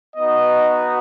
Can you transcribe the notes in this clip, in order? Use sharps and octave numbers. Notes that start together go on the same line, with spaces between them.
B3 D#4 F#4 D#5